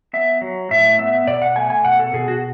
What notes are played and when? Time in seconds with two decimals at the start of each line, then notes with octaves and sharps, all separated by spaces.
0.13 B3 E5
0.41 F#3
0.71 A2 E5
0.99 B3 E5
1.27 B2 D5
1.42 F#5
1.56 A3 G#5
1.70 G#5
1.85 B2 F#5
1.99 A4
2.14 B2 G#4
2.28 F#4